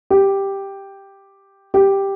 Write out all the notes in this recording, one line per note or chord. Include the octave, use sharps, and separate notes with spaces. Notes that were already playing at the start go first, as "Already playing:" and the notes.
G4
G4